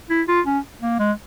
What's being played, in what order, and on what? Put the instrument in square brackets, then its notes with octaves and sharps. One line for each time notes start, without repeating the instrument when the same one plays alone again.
[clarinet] E4
F4
C#4
A#3
G#3